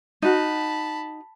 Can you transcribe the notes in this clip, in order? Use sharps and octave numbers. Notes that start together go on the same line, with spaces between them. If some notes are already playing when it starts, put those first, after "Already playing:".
D#4 F#4 A5 B5